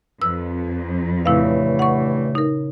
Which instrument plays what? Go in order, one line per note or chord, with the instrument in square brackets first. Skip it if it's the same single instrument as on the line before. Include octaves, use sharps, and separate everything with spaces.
[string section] F2 [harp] B4 [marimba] E6
[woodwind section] G2 E3 A3 [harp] A#2 C#3 [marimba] E4 F5
[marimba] F#5 C#6
D#4 A#4